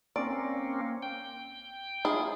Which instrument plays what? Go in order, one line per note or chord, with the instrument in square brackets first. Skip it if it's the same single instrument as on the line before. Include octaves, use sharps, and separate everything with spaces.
[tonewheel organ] A#3 C4 C#4 [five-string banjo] D5
[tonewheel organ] G5
[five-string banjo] E4 F4 G#4